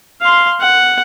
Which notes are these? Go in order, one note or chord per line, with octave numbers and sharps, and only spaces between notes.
F5 C6
F#5